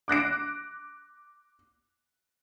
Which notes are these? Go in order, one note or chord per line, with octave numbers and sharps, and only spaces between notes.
D6 F#6 A#6 D7